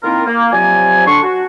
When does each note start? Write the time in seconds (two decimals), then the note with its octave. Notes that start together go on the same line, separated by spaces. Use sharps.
0.04 D#3 A#3 C4 E4 F4 A#4
0.26 A#3
0.53 C3 F3 F#3 D5 G#5
1.07 D3 D4 C6 C#6
1.23 F#4